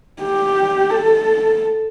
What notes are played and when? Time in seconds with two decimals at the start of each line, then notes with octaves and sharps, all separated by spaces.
0.23 G4
0.90 A4